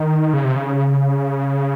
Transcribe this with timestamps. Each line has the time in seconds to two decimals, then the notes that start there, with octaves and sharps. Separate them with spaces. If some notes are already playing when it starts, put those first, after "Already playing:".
Already playing: D#3
0.33 C#3
0.44 C3
0.56 C#3